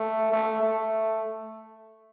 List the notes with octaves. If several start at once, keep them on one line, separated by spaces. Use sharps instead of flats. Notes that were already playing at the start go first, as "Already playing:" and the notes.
Already playing: A3
A3
A3